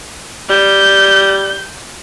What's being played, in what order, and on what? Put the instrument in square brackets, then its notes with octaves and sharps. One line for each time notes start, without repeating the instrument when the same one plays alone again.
[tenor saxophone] G3 [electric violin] G6